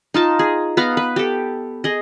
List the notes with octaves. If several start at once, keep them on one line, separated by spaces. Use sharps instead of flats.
D#4 F4 A5
G#4
B3 B4 F5 A#5
B4
G4 A4
G#4 D#5